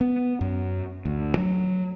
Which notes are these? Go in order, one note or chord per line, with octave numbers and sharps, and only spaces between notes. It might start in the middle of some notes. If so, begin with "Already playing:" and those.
B3
F#2
D2
F#3